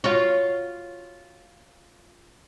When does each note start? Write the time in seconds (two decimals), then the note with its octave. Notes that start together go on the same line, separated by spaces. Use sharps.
0.04 F4 F#4 C#5